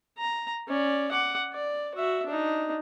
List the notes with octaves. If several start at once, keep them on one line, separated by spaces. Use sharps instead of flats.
A#5
C#4 D5
F#5 D6
D5
F#4 E5
D4 D#4